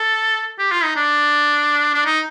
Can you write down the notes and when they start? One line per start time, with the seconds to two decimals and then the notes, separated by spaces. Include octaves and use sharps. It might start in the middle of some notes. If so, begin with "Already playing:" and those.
Already playing: A4
0.59 G4
0.71 F4
0.83 D#4
0.96 D4
1.94 D4
2.06 D#4